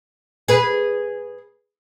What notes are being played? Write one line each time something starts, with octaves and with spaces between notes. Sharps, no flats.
G#4 B4